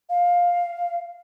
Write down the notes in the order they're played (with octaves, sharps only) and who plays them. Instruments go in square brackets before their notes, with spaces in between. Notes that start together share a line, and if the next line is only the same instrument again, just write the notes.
[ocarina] F5